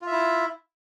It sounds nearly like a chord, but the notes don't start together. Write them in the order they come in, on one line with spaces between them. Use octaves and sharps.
F4 E5 E4